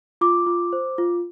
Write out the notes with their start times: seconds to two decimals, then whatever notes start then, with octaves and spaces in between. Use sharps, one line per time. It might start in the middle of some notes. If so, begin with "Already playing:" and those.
0.21 F4 D6
0.47 F4
0.73 C5
0.98 F4